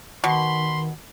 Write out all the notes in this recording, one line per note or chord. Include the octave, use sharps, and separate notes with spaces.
B2 D#3 B5 C6